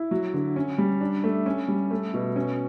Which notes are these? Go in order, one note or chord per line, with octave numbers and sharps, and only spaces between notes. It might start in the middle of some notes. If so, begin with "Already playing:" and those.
Already playing: E4
F#3
D3
C#4
G3
D4
A3
C#4
G3
A3
B2
C#4